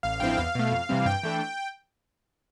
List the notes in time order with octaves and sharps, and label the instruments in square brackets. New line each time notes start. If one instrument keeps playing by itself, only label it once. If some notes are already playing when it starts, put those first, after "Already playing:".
[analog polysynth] A1 F5
G2 F3 C4 E4 G5
E2 F5
B2 A3
F2
C3 E3 G3 C4
G2 G5
E3 A3 D4